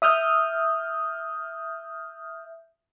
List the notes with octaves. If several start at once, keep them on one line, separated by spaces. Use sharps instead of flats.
E5 D#6 F6 G6